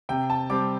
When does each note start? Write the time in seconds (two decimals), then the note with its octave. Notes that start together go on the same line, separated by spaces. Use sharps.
0.09 C3 G5
0.30 A5
0.50 G3 C4 D6